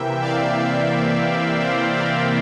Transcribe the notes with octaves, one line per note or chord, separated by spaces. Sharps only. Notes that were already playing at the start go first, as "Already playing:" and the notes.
Already playing: C3 E3 A#3 E5 G5
D5 F5
C5 E5
A#4 D5